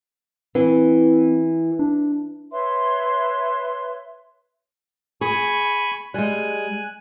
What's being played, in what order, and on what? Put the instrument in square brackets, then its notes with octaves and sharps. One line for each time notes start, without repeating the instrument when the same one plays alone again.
[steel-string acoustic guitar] E3 [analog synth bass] C4
[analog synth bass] D4
[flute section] B4 C#5 E5 C6
[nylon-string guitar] G#4 [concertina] G#5 B5 C#6
[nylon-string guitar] G3 G#3 [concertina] G#5 F#6